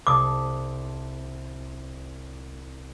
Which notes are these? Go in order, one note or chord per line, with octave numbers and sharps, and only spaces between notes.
C2 G#4 A5 D6 D#6